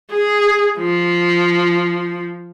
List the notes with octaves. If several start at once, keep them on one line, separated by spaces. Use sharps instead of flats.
G#4
F3